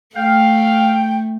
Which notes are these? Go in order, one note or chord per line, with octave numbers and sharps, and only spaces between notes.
A3 F5 G5